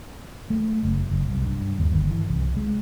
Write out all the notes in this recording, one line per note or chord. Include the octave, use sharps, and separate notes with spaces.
A3
F#1
F#1
C2
G2
D#2
G1
E3
C2
G#3